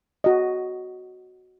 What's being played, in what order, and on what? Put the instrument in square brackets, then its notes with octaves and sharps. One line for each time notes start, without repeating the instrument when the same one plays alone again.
[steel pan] F#4 D#5